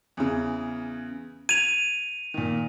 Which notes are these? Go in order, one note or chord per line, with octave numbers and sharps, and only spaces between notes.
E2 C#3
G#6 D#7 F7
A#2 D#3